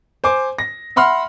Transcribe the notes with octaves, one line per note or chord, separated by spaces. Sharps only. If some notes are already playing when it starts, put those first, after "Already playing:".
C5 G#5 D6
A#6
E5 F#5 B5 C6 F6